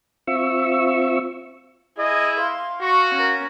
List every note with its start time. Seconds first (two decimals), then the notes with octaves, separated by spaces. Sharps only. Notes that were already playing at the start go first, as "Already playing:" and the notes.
0.27 C4 F4 E5 C#6 E6
1.98 E4 G#4 D#5
2.40 F5 C6
2.81 F#4 C#6
3.14 C#4 A#4